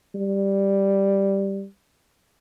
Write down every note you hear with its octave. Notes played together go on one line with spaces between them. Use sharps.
G3